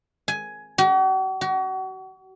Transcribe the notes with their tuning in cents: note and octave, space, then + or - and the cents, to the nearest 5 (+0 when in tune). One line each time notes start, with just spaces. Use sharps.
G#5 +10
F#4 +45
F#4 +35